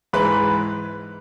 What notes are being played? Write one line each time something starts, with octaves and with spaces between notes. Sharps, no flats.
G#2 E3 G#3 B4 B5